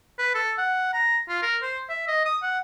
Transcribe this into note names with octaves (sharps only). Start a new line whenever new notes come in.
B4
A4
F#5
A#5
F4
A#4
C5
E5
D#5
D#6
F#5